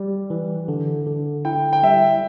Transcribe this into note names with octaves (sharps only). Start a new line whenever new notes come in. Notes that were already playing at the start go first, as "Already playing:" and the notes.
Already playing: G3
E3
D3
D3
E4 G5
G5
G3 E5